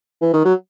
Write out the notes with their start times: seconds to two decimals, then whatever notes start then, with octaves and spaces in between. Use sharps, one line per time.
0.21 E3
0.33 D#3
0.45 F#3